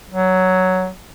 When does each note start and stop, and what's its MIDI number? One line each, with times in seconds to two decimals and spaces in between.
0.11 0.89 54